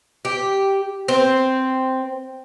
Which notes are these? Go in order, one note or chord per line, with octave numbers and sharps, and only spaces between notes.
G4
C4